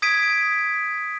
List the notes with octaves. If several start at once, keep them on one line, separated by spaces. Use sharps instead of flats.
D#6 G#6 B6 D7 D#7